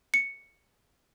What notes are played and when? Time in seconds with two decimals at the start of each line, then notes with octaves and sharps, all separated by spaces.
0.14 C#7